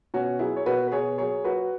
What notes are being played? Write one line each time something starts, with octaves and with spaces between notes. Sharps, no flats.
B2 C#4 F#4
F#3 E4 G#4
C#5
B2 F#4 B4
B4
B2 G#4 C#5
F#3 G#4 C#5
F#3 F#4 B4